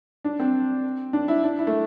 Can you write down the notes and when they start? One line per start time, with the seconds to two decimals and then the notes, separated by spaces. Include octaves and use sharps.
0.24 D4
0.40 C4
1.13 D4
1.28 E4
1.44 D4
1.59 E4
1.67 A3